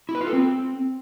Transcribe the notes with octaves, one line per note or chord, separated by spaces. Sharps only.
E4
B4
F4
A4
C4